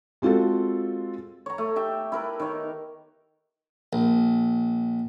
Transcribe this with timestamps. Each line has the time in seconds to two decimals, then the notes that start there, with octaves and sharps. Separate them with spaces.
0.22 G#3 C4 F4 F#4 A4
1.46 C#5 A#5
1.58 A3
1.76 G4 E5 G5
2.12 E4 A#4 B4
2.40 D#3 C#5
3.93 A#1